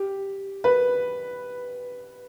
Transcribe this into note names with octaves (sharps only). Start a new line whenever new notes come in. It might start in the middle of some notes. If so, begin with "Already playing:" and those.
Already playing: G4
B4